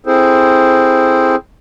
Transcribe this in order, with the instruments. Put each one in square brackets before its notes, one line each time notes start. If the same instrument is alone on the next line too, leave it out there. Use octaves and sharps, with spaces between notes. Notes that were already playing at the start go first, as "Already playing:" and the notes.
[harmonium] C4 E4 G#4 A4 C5